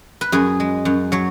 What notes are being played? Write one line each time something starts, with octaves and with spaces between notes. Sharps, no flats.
B4
F#2 G#4
G#3
F#2
F#3 C#5